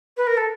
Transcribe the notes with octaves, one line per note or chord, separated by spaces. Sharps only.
B4
A#4
A4